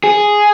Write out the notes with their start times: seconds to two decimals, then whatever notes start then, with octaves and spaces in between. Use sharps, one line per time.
0.04 G#4